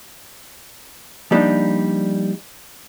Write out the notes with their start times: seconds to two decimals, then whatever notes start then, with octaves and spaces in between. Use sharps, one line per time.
1.31 F3 G3 A#3 D4 D#4